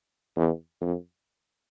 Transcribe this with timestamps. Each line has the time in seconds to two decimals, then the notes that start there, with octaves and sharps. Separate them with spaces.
0.36 E2
0.81 F2